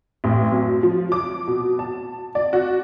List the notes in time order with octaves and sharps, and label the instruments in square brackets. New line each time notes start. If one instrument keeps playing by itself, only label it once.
[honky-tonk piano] A1
F#2
F3
D6
B2
A5
D5
F#4